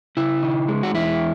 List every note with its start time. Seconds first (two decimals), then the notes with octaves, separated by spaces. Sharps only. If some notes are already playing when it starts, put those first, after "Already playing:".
0.17 C#3 E4
0.43 D#4
0.68 G#3
0.83 F#4
0.94 E2 E4